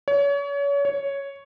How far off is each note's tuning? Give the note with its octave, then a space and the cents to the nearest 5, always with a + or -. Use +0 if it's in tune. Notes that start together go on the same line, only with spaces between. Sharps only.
C#5 +35
C#5 +5